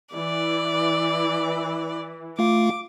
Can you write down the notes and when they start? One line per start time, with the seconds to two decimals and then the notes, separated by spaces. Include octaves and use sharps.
0.15 E3 D5
2.39 A3 F4 F5 D6